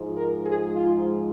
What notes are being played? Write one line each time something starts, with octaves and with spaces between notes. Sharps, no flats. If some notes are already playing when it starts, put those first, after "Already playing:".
Already playing: G#2 F3 G#3
A#4
G#4
F4